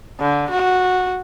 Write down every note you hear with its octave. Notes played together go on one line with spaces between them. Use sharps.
D3
F#4